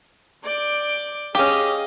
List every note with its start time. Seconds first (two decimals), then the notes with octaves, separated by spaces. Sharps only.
0.45 D5 D6 G6
1.35 C#4 G4 G#4 D#5 F5